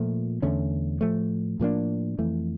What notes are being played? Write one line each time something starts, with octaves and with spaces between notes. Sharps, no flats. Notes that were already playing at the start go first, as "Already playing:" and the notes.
Already playing: A#2 F3 A3
E2 D3 A3 C#4
A2 F3 A3
A2 F3 A#3 D4
F2 E3 A3